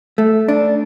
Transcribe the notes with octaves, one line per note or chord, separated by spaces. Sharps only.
A3
D4